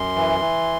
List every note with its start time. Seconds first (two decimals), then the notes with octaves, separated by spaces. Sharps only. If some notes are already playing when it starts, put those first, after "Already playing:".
Already playing: F#2 C6
0.16 E3
0.40 E3